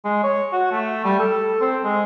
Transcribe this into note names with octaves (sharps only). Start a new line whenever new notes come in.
G#3
C#5
F#4
A3
G3
A4
C4
G#3